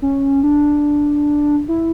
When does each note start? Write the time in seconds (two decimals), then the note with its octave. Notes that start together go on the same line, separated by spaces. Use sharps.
0.02 C#4
0.43 D4
1.68 E4